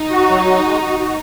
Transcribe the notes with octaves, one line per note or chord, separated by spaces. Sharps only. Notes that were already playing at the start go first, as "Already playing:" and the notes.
Already playing: D#4
F#4
F#3
F#4
G#3
F#4
F#4